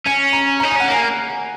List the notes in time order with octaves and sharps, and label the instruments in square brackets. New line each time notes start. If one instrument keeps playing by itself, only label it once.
[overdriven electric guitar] C#4 [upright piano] G#5
[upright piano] A#5
[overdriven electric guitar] D#4 [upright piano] A#5
[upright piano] G#5
[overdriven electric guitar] C#4 [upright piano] F#5
[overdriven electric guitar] A#3 [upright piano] G#5